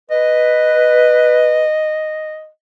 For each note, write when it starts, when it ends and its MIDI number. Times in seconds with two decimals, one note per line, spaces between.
0.11 1.64 71
0.11 2.48 75